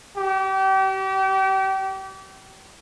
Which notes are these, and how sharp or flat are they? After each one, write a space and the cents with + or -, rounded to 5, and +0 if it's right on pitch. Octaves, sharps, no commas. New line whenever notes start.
G4 -35